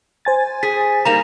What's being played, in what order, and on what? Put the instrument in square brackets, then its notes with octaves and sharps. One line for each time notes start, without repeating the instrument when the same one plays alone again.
[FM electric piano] C5 G#5 A6
[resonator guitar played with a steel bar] G#4 [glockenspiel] B6
[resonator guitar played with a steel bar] G3 A#3 D#4 [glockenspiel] A#5 F7